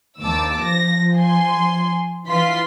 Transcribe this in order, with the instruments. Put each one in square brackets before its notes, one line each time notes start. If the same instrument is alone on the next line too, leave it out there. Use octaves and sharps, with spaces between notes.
[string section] D#2 [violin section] A5 D6 E6
[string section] F3 [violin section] A#6
[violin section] G#5 C6
[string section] E3 F4 [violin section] C6 B6